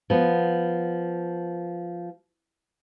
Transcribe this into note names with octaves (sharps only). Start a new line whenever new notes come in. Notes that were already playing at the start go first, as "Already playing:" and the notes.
F3 B3